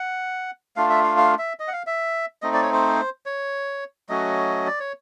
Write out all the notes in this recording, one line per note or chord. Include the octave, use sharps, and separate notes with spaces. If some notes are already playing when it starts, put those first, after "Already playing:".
Already playing: F#5
A3 D4 F4 F5
E5
F5
F5
E5
D#5
F#5
F5
E5
A3 C4 D#4 D#5
D5
C#5
C5
C#5
F#3 A3 C#4 F#4 D#5
D5
C#5